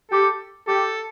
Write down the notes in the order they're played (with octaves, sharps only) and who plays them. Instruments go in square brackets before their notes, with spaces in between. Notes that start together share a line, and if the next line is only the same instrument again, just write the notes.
[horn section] G4 [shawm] A4
[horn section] G4 [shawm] A4